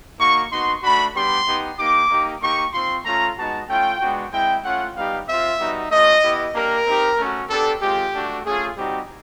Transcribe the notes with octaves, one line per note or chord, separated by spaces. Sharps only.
A#3 D#4 F#4 C#6
B3 D#4 F#4 C6
A3 D4 F#4 B5
G3 B3 D4 G4 C6
B3 D#4 G4
A#3 D#4 G4 D6
A#3 D#4 G4
A#3 D#4 G4 C#6
C4 F4 C6
A3 C#4 F4 A#5
G#3 B3 D#4 F#4 A5
A3 C#4 F4 G5
G#3 B3 D4 F#4
G#3 C4 E4 G5
A3 C#4 F4 F#5
G3 B3 D#4 G4 F5
C4 F4 E5
G3 B3 D#4 F#4
A3 C#4 F4 D#5
B3 E4 G4
A#3 D4 G4 A#4
C4 D#4 G4
A3 C#4 F#4
B3 D4 G4 A4
G#3 C4 F4 G4
A3 D4 F#4
A3 C#4 F4 G#4
G3 C4 D#4 F#4 G4